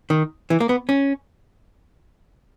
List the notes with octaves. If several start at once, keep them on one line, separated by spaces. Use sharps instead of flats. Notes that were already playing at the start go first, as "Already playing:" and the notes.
D#3
E3
A#3
B3
C#4